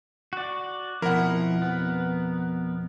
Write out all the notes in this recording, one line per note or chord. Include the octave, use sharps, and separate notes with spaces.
F#4 D5
F2 B2 F3 E4 A#4 F#5
B3